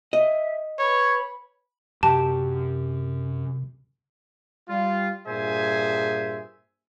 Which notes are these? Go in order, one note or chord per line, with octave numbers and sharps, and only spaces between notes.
D#5 E5
B4 C#5 B5
F#2 C3 G4 A5
G3 F4
G2 A#2 G#4 C5 E5 G#5